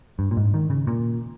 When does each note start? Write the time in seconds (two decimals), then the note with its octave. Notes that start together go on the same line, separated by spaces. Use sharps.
0.19 G2
0.31 A#2
0.37 G#2
0.54 D#3
0.70 C#3
0.87 A#2